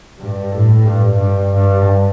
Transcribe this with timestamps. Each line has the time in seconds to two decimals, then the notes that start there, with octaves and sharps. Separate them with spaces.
0.18 G2
0.52 A2
0.85 G2
1.19 G2
1.54 G2